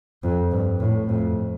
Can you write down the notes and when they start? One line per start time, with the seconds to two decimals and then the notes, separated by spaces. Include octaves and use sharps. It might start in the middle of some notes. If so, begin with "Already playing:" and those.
0.23 F2
0.51 G2
0.80 A2
1.09 F2